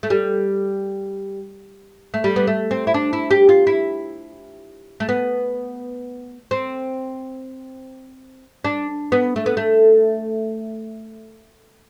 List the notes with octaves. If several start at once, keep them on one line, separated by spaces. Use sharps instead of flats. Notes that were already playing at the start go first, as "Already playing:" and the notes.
A3
G3
A3
G3
B3
A3
C4
E4
D4
E4
G4
F4
E4
A3
B3
C4
D4
B3
A3
B3
A3